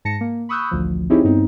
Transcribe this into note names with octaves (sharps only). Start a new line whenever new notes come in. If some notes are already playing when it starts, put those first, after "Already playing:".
G#2 A5 A#6 C#7
A#3
B5 C#6 D#6 E6 F#6 G6
A1 D2 F3
C4 D#4 E4 G4 G#4 C#5
G2 B3 C4 D#4